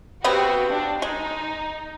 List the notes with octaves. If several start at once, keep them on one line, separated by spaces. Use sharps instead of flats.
C#3 B3 C4 F#4 G4 B4
D4
G#3 D#4